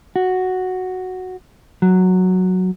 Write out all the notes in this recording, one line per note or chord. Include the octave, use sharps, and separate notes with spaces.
F#4
F#3